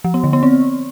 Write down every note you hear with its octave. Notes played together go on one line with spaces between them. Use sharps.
F3
B3
D3
B3
C4